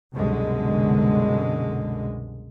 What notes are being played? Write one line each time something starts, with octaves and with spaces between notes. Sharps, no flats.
C2 F#2 B2 D3 G#3